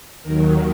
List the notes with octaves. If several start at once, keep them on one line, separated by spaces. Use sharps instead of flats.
D#2 D#3 F#3 A#4